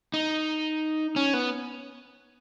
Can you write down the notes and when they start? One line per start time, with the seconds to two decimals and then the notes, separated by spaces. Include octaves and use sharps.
0.14 D#4
1.16 C#4
1.34 B3